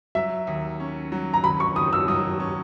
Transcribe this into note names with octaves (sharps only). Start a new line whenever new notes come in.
F#3 E5
D#2
C#4
F#3
A#5
D#2 B5
C#6
D#3 D#6
E6
F#3 D#6
C#4